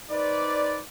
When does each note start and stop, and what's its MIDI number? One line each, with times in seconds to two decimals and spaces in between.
0.10 0.79 63
0.10 0.79 71
0.10 0.79 72
0.10 0.79 74